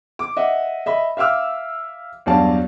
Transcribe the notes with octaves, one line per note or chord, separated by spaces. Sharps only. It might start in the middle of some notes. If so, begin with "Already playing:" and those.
D6
D#5 E5 F#5
D#5 E5 B5
E5 F5 D6 E6 F6
E2 G2 F#3 D5 F5 A5